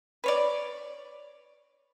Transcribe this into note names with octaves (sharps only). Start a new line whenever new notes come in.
B4 C#5 D5